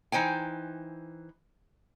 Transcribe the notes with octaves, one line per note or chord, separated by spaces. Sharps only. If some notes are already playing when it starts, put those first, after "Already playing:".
E3 D#4 C5 G5 G#5